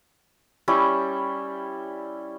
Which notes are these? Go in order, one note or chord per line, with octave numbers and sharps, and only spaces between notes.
G3 C#4 E4